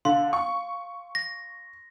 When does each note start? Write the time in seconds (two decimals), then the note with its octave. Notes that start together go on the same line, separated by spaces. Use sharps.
0.05 D3 F5 C6
0.33 C#6
1.15 A#6